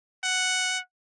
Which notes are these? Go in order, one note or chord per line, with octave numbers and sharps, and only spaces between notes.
F#5